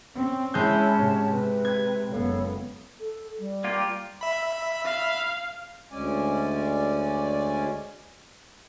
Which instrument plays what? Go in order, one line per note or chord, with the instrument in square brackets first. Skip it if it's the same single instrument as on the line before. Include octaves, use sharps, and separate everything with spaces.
[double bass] C4 C#4
[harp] G#3 G6 [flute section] C#4 C#5 A5 [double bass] E4
[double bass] G#2 C3
[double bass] C3 [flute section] B4
[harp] G#6
[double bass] F#1 B3 [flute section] A4 C#5 F5
[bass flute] A4
G3
[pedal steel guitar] A#3 F4 G4
[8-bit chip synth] E5 B5
[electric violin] F5
[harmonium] D2 G#3 C#4 D5 G#5